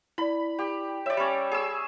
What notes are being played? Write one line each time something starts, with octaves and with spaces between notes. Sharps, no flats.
E4 D5 B5
G4
C#5 D5 E5
G3 C#4
G#4 E6